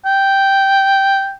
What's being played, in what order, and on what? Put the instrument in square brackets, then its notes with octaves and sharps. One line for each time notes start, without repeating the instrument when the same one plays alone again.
[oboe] G5